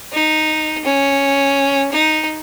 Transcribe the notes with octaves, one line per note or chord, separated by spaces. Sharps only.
D#4
C#4
D#4